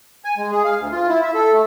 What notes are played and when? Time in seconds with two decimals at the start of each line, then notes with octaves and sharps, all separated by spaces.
0.25 G#5
0.37 G#3
0.52 G#4
0.65 F5
0.79 D2
0.92 F4
1.09 E4
1.23 E5
1.34 A4
1.53 A3